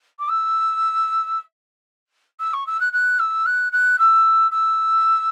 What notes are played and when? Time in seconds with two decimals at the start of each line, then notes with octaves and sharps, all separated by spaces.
0.19 D6
0.29 E6
2.40 E6
2.53 C#6
2.67 E6
2.80 F#6
2.93 F#6
3.19 E6
3.46 F#6
3.72 F#6
3.99 E6
4.51 E6